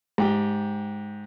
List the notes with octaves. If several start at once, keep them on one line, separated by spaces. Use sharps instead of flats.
G#2 G4 G5